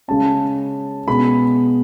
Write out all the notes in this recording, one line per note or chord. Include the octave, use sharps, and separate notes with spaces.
C#3 G#3 C#4 A5
B2 G#3 B3 B5